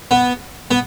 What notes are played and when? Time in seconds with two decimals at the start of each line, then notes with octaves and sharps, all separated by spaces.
0.11 B3
0.71 B3